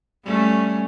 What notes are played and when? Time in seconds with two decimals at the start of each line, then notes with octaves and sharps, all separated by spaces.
0.24 G3 A3 C#4